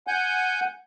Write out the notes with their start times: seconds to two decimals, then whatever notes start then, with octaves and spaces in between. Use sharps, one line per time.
0.07 F#5 G#5 G6